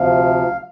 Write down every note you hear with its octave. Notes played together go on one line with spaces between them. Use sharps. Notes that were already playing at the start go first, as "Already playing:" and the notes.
Already playing: D2 C3 F3 F5